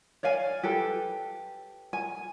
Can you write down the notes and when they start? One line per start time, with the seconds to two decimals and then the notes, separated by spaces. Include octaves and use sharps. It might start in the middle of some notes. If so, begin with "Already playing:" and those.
0.23 C#5 D5 F5 G#5
0.63 G4 A4 B4
1.93 G#5